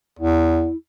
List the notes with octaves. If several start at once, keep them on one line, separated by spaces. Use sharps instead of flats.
E2 E4